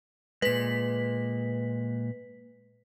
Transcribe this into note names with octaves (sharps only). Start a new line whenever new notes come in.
A#2 G#3 B4 B6